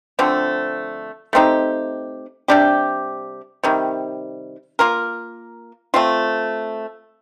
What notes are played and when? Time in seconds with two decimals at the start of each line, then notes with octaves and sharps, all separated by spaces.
0.19 D3 F3 A3 C4
1.33 A3 C4 D#4 G4
2.48 C3 G3 D4 G4
3.64 C3 D#3 G3
4.79 A#3 F4 A#4
5.94 A3 C4 F4